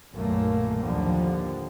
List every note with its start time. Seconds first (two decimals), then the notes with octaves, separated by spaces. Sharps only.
0.13 B1 F#2 A#2 D#3 A3 A#3
0.80 D#2 A2 D3 F3 G3